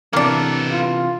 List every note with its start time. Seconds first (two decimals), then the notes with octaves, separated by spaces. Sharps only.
0.13 C3 E3 A#3 B3 D4 A4
0.72 F4